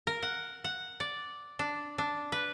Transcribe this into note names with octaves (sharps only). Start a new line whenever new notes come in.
A#4
F#5
F#5
D5
D4
D4
B4